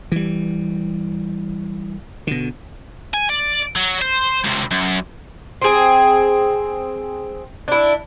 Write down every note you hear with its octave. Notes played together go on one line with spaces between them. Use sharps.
E3 G3
B2 D3
G#5
D5
F#3
C5
C#2 C3
F#2
C4 G#4
D4 E4